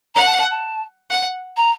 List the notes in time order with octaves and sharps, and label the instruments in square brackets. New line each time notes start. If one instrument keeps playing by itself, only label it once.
[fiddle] F#5 [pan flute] A#5
[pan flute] A5
A5
A5
[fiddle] F#5
[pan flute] A#5